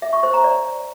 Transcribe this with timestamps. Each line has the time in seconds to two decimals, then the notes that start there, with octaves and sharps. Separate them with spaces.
0.02 E5
0.13 C#6
0.23 C5
0.34 A#5
0.44 D5